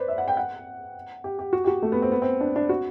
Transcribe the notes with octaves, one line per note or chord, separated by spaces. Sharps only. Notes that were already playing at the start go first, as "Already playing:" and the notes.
Already playing: B4 C5 D5
E5
F#5
G5
F#5
G4
G4
F#4
G4
F#4
A3
B3
C4
B3
C4
D4
D4
F#4